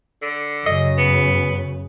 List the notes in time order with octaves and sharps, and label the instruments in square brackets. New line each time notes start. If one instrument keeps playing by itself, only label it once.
[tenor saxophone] D3
[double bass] F#2 C#3 [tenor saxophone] D#5
[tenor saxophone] B3